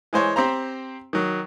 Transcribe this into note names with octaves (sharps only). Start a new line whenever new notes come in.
E3 G#3 C5 C#5
C4 G4 C5 A#5
D#3 F#3